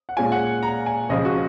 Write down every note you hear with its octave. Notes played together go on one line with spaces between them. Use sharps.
F#5
A#2 G#3 C#4 F4 G#5
F#5
A#5
G#5
C#2 C#3 F3 D#5
F#4